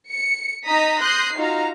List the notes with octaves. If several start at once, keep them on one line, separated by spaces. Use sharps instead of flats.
C#7
D#4 D#5 A#5 D#6 B6
C6 D#6 F#6 G6 A#6 C7
D#4 F4 F#4 F5 A#5